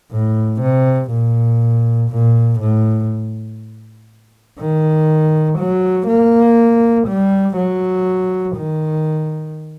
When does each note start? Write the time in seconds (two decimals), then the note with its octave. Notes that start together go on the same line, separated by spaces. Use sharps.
0.11 A2
0.61 C3
1.11 A#2
2.10 A#2
2.60 A2
4.59 D#3
5.58 F#3
6.08 A#3
7.07 G3
7.56 F#3
8.56 D#3